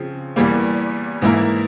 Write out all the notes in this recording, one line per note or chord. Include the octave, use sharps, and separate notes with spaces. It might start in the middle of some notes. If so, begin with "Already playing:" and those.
Already playing: C#3 F3 C4
E2 E3 G3 A#3
G#2 E3 A#3 E4 A#4